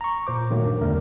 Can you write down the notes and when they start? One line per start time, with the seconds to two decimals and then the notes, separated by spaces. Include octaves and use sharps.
0.01 A#5 C#6
0.27 A#2 C5 D6
0.50 A#2 D#3 F#3 A3 A#3
0.65 G2
0.81 E2 D3 G3 A3 A#4